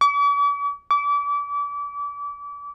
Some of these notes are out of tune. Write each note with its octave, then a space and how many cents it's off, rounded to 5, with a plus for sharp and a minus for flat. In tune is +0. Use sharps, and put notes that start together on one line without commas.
D6 -45
D6 -30